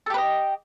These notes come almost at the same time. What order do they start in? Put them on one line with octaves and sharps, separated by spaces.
A4 G4 B4 D#5